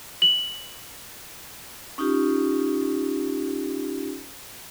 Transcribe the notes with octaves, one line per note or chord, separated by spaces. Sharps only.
F#7
C#4 D#4 F4 G4